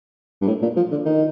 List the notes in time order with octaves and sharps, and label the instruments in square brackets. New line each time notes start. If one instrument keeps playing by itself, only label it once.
[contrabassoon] G2
A2
A#2
F3
D3
D#3